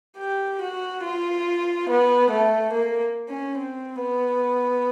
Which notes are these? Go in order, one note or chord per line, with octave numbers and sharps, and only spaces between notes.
G4
F#4
F4
B3
A3
A#3
C#4
C4
B3